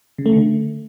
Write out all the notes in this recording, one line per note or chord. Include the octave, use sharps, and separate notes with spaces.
C#3
A3
D3